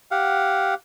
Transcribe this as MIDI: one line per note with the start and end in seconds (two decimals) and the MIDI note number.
0.11 0.74 67
0.11 0.74 77
0.11 0.74 78